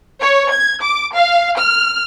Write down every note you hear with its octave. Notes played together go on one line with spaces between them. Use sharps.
C#5
G#6
D6
F5
F6